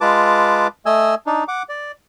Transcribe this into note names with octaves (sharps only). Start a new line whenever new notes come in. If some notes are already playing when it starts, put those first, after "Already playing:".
G#3 F4 B4 A5 D6
A3 D#5 G#5 E6
D4 D#4
F#5 D6
D5